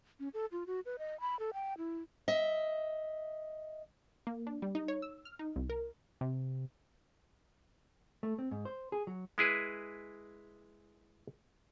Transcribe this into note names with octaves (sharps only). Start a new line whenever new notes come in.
C#4
A4
F4
F#4
B4
D#5
B5
A4
G5
E4
D#5 E5
A#3
D4
G3
D#4
C#5
E6
F6
D#4
C2
A#4
C3
A3
C4
G#2
C5
G#4
F#3
G#3 E4 G#4 B4